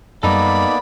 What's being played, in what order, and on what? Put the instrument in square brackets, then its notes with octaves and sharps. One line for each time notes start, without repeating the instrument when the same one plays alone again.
[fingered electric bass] F#2 G3 [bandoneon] A#3 B3 D5 [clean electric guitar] D#4 A4 [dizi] B5